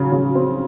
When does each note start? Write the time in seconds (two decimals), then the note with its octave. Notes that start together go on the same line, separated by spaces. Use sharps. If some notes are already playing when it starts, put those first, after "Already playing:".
Already playing: C#3 F#3
0.12 C#3
0.35 C4